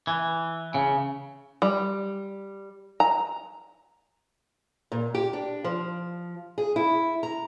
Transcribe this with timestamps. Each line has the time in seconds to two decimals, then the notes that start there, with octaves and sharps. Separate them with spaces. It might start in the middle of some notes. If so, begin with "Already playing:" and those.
0.07 E3
0.74 C#3
1.62 G3
3.00 A#5
4.92 A#2
5.15 G4
5.33 D4
5.64 F3
6.58 G#4
6.76 E4
7.23 A#5